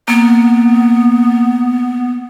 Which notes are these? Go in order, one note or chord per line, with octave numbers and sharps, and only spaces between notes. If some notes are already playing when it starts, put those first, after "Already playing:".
A#3 B3